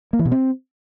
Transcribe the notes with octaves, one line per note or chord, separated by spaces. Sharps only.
A#3
E3
B2
C4